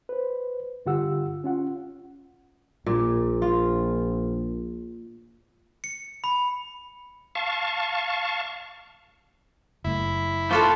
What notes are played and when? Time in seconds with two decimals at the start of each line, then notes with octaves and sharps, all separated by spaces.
0.09 B4 C5
0.86 G2 D3 F4 G4 F#5 E6
1.44 C#4 F4 F#5
2.86 A#1 A#2
3.42 F4
5.84 C#7
6.24 B5
7.35 F5 A5 C#6
9.84 F#1 A3 E4
10.51 F3 A#3 F4 A4 B4 C#6